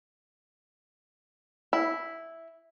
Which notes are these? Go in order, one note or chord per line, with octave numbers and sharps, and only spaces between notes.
E4